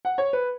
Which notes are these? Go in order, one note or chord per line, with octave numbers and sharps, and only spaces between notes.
F#5
C#5
B4